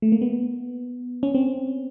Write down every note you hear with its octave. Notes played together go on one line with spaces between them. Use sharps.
A3
A#3
B3
C#4
C4